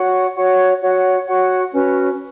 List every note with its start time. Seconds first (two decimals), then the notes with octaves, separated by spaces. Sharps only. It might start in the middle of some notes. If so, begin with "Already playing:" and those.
Already playing: F#4 C#5 F#5 C#6
0.36 F#4 C#5 F#5 C#6
0.82 F#4 C#5 F#5 C#6
1.27 F#4 C#5 F#5 C#6
1.72 C#4 F#4 B4